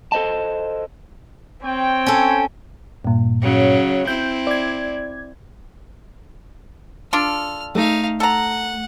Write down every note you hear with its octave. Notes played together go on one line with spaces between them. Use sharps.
A4 C5 D#5 A5
C4 C#5 G5
C#4 A4
G2 A#2
C#3 F#3
C4 E4 G6
D5 G#6
D4 F4 A4 F6
A3 D#4 F5
A4 F#5 A#5